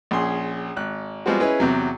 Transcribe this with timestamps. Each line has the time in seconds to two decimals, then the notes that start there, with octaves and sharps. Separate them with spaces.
0.11 A#1 C#4 G#4 C6
0.76 G#1 F#6
1.26 F3 G3 G#3 B3 C4 F#4
1.40 C#4 E4 G#4 B4 D#5
1.60 E2 C3 F#3